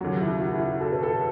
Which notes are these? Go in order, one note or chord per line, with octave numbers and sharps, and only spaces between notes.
D#2 C#3 F#3 F#4
E4
F#4
E4
F#4
A4
B4
A4